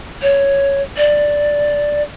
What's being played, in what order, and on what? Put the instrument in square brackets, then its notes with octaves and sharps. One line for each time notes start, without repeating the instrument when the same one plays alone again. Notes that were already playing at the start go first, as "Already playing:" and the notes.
[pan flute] C#5
D5